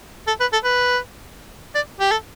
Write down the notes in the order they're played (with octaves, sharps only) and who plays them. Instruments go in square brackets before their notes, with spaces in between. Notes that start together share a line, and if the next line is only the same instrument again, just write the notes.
[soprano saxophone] A4
B4
A4
B4
D5
G4
A4